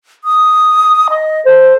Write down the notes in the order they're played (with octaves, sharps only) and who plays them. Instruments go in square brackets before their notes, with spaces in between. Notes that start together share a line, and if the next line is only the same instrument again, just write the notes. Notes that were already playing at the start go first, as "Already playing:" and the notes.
[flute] D#6
D#5
[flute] A4 [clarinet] C5